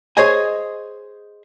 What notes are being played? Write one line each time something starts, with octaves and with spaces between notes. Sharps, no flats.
G#4 C5 C#5 D#5 G#5